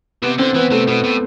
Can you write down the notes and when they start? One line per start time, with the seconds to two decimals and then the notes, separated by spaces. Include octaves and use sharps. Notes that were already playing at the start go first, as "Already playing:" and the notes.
0.22 C3 B3
0.39 D3 C4
0.55 E3 B3
0.71 C3 A3
0.88 B2 B3
1.04 A2